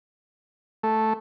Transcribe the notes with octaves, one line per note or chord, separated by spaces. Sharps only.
A3